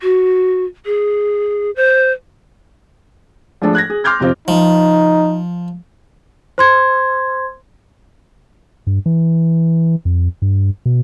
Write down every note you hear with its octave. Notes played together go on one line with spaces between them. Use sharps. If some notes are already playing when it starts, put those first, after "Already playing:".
F#4
G#4
C5
F3 G#3 A3 D4 A4
F#6 G#6 A#6
G#4
C6 D6 F6 G6 G#6
F2 C3 C4 F4
F3 D#4
C5 C6 G#6
G2
E3
F2
G2
B2